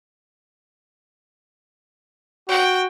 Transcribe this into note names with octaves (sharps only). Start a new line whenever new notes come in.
F#4 G5